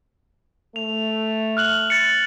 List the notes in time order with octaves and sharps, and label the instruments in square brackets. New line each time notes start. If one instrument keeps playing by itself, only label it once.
[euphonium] A3 [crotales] F7
[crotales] F6 F#6 F#7
A6 C#7